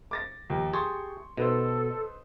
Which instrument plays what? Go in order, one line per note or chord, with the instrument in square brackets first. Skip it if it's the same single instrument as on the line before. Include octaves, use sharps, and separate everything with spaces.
[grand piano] D6 A6 A#6
D#2 F3
[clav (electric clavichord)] G4 G#4 A5 [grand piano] C6 C#6
[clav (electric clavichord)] B2 [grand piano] D#4 B4 C5 [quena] A4